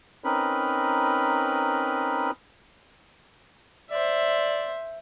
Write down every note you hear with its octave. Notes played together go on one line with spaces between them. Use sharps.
C4 C#4 D#4 A#4 B4 B5
C5 D5 E5